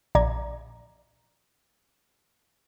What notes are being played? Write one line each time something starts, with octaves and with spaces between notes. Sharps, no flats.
A#1 D5 A#5 G#6